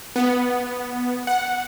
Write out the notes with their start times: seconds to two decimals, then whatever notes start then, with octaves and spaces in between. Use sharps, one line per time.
0.16 B3
1.27 F#5